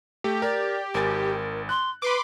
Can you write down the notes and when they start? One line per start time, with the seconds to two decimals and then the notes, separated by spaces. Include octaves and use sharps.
0.24 A3 G4
0.42 A#4 D5
0.94 G#1 A#4 G#5 A6
1.69 C6 F#6
2.02 B4 B5 C6 D6